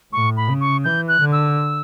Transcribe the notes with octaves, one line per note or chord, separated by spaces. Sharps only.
A2 C#6
B5
C#3
C#6
E3 G6
F#6
D3
E6